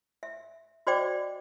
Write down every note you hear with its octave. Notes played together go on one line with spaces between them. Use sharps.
E5
F#4 C5 D5 D#5 G5 D6